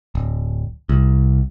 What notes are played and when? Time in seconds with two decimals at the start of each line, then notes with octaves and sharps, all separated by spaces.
0.15 D1
0.89 C2